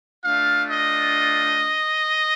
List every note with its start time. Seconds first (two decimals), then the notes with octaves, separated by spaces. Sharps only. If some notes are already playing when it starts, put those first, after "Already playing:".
0.25 A3 D4 F4 F5
0.70 D#5